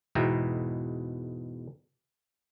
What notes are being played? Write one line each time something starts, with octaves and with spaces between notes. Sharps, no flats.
E2 G#2 B2 E4 G5 A#5